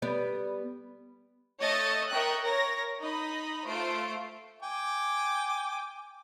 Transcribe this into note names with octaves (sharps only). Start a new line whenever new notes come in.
G3 B3 D5
A3 C#5 D#5 E6 A6
A#4 D#5 E5 G5 C#6 F#6
A#4 C#5 A#6
D#4 D#5 B5
A3 F4 C5 C7 D7
G5 G#5 D6